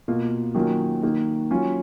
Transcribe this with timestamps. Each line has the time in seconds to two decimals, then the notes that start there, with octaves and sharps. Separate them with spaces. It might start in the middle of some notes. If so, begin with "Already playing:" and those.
0.08 B2 A#3 F4
0.55 D#3 F#3 A#3 C#4 F4
1.02 D#3 A#3 D#4
1.51 F#3 C#4 F4